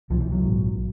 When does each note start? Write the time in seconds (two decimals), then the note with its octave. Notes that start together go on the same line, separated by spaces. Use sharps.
0.10 C2 B2 F3
0.20 E3
0.32 F#3
0.42 A#1 G#2